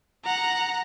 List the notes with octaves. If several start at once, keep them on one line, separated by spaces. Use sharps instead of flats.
F#5 A#5